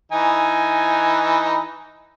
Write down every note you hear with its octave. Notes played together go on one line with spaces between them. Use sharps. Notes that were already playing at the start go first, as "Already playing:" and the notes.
E3 D#4 G#5